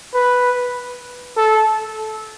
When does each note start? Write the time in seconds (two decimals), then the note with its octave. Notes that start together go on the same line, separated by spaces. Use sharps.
0.15 B4
1.37 A4